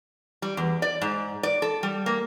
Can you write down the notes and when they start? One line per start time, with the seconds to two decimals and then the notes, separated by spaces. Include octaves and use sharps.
0.42 G3
0.57 E2
0.82 D5
1.01 G#2
1.43 D5
1.62 A4
1.83 G3
2.06 A#3